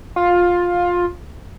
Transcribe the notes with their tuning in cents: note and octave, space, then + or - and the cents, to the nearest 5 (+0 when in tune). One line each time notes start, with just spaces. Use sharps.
F4 +15